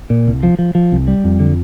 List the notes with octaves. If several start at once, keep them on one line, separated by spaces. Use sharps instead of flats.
A#2
C2
F3
F3
F3
C2
G3
F2
D3